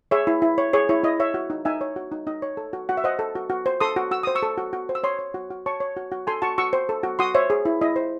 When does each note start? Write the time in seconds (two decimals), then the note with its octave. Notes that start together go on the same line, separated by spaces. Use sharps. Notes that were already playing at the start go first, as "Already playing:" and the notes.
0.11 G#4 C#5 E5
0.27 E4
0.42 E4
0.58 C#5
0.73 G#4 C#5
0.89 E4 C#5
1.04 E4 D#5
1.20 C#5 E5
1.34 F#4
1.50 D#4
1.65 D#4 E5 G#5
1.81 C#5
1.96 F#4
2.12 D#4
2.27 D#4 D#5
2.42 C#5
2.57 A4
2.73 F#4
2.89 F#4 F#5
2.97 E5
3.04 C5 D#5 F#5
3.19 A4
3.35 F#4
3.50 F#4
3.66 C5
3.80 A4 C6 D#6
3.96 F#4
4.11 F#4 E6
4.23 C5 D#6
4.35 C#6 E6
4.43 A4
4.58 F#4
4.73 F#4
4.89 C5
4.95 E6
5.04 C#5 C6 D#6
5.19 C#5
5.34 F#4
5.51 F#4
5.66 C#5 A5 C#6
5.80 C#5
5.97 F#4
6.12 F#4
6.27 A4 G#5 C6
6.42 F#4 A5 C#6
6.58 F#4 C#6 E6
6.73 C5
6.89 A4
7.03 F#4
7.19 F#4 C6 D#6
7.34 C5 C#5 E5
7.50 G#4
7.65 E4
7.81 E4 D#5
7.96 C5